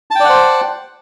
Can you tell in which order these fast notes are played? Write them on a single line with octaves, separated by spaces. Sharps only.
A5 G5 D5 F#5 C5